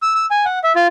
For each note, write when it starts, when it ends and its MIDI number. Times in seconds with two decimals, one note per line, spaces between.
0.02 0.14 88
0.15 0.26 88
0.31 0.45 80
0.45 0.59 78
0.64 0.72 76
0.76 0.87 65